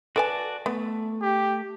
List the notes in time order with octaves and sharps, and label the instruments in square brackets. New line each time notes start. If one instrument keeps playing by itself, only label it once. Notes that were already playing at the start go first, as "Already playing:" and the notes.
[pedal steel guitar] F#4 D5 A5 [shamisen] A4 B4 G#5
[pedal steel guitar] A3 [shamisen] B3
[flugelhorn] G4